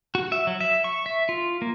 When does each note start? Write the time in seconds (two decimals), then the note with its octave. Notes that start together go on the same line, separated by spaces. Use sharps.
0.15 F#4
0.32 E5
0.47 F#3
0.61 E5
0.84 C#6
1.06 E5
1.29 F4
1.62 A#3